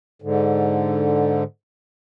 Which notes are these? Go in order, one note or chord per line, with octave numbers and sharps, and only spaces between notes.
G#2 D3